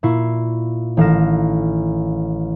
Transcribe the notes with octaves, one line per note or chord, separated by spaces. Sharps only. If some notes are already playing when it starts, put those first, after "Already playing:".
A#2 E4 C#6 C7
A1 D#3 F5 F6 A#6 E7